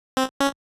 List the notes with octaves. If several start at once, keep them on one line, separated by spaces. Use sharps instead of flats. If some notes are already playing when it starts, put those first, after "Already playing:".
C4
C#4